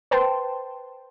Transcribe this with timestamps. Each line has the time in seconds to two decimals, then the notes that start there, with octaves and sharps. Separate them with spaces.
0.11 B4 C5 G5 A5 C6